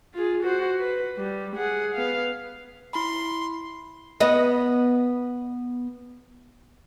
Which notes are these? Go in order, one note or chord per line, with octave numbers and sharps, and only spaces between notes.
F4 G#4
F#4 C5
B4
G3
G#4 F#5
B3 F5
E4 B5 C6
B3 D#5